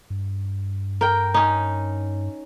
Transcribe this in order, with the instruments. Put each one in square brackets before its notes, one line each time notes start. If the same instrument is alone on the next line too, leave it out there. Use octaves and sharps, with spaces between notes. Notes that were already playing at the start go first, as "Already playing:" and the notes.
[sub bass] G2
[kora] A#4 G5
C#4 D#4